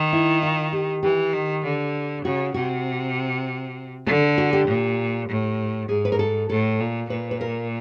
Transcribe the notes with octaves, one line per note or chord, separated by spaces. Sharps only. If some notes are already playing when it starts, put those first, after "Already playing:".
Already playing: D#3
E4
F4
G4
E3 G4
D#3
D3
C#3 F#4
C3 F#4
D3 A4
F#4
G4
A#2
A2
G#2 G#4
B4
A#4
A4
A2 A4
A#2
A#2 B4
B4
A#4